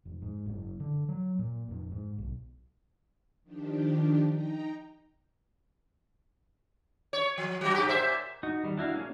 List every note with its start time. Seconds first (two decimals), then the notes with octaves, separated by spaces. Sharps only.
0.05 F1
0.22 G#2
0.46 F#1
0.80 D3
1.09 F#3
1.39 A#2
1.68 F1
1.91 G#2
2.18 B1
3.44 D#3 F3 D4 G4
4.26 D#4 G5 A#5
7.13 C#5
7.38 F3
7.61 F#3 F#4
7.74 G2 G4
7.89 A#2 C5 E5
8.43 D#4 F#4
8.63 D#3 G3
8.78 D4 E4 F#4 F5
8.94 A#3 C#4 G#4